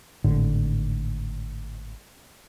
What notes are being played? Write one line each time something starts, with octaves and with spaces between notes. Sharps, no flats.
G#1 A2 D3